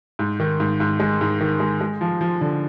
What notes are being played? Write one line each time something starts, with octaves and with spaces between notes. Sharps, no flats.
G#2
D#3
G#2
G#2
G#3
G#2
D#3
G#3
G#3
F3
F3
D3